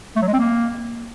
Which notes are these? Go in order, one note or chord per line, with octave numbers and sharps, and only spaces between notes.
A3
F#3
G#3
C4
A#3